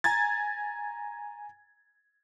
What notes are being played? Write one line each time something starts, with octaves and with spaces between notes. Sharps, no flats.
G#5 A#5 G#6 A6